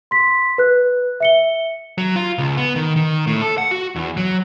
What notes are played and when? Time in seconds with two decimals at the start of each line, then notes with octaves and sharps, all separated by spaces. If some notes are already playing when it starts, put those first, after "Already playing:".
0.11 C6 B6
0.58 B4 F#6
1.20 E5 C#7 G7
1.98 F#3
2.16 F4
2.38 C#2
2.57 B3
2.76 D#3
2.96 D#3
3.27 A2
3.41 A4
3.58 F#5
3.71 F#4
3.96 E2
4.17 F#3